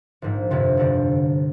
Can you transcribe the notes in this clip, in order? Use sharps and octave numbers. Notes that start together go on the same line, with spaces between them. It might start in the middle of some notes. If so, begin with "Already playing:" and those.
A#1 G#2 F3
G1 F2 C3 F3 C4
G1 F2 D3 G3 D4